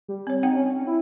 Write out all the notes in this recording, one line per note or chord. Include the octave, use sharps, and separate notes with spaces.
G3
C4 C#5
C4 D#4 F#5 G5
C#4
E4